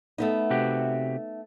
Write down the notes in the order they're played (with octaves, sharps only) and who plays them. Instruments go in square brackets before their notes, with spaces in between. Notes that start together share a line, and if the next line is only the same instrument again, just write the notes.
[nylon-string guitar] A3 B3 D#4
[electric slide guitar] C3 F#4 G4